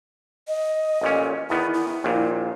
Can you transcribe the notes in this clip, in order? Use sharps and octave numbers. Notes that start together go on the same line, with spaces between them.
D#5
A1 A#2 C#4
E2 D#3 B3 E4
E4
A#1 D#2 A#2